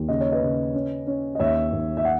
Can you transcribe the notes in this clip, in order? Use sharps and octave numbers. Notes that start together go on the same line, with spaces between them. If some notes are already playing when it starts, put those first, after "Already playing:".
Already playing: D#2
C#3 D#5
C#5
B4 D#5
C#3
C#4
C#4
D#5
D#2 C#5 E5
D#2
E5
F#5